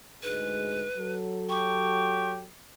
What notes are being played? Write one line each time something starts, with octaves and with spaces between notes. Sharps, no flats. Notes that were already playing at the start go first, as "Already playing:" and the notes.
D2 G#2 G#3 B4
F#3 A4
G4 C#6